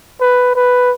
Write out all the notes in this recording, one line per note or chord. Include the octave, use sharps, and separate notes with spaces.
B4
B4